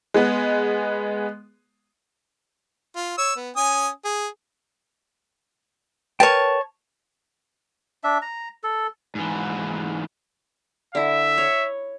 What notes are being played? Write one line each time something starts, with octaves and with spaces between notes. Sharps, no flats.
G#3 B3
F4
C#5 E6
B3
C#4 G#5 D#6
G#4
A#4 B4 C#5 G5 A5
D4 E5
A#5
A4
G#2 E3
D3 E4 E5
C#5